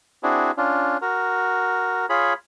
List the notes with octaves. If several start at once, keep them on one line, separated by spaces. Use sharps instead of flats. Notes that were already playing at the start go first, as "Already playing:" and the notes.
C4 D4 E4 F#4 G#4
C#4 D4 F4
F#4 A#4
F4 G#4 C#5 B5